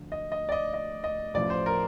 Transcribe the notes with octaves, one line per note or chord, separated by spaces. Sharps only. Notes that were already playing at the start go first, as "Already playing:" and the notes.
Already playing: D2 D3 F3
D#5
D#5
D5
D#5
D#5
D#5
A1 A2 F3 D5
C5
A#4